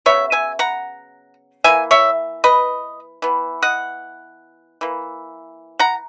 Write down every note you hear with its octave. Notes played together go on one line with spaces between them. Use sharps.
C#3 F#3 B3 C#5 E5
E5 G#5
F#5 A#5
E3 A#3 E5 G#5
C#5 E5
B4 D#5
E3 B3
D#5 F#5
E3 A#3
F#5 A#5